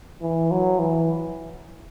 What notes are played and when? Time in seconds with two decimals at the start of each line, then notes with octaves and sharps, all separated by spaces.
0.22 E3
0.51 F#3
0.79 E3